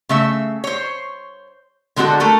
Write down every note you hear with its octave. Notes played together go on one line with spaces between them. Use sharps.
C#3 A3 E5
C5 C#5
D3 G#3 C4 F#4 A4
A3 A4 A#4